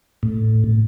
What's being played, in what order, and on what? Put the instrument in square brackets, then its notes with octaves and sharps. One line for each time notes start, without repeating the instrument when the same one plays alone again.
[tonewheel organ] A2